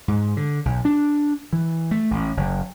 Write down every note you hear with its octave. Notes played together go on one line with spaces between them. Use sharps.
G#2
D3
B1
D4
E3
A3
A1
F#1